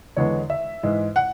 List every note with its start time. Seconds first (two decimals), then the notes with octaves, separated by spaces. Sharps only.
0.17 E2 D3 G#3 B3 C#5
0.50 E5
0.83 G#2 E3 G#3
1.16 F#5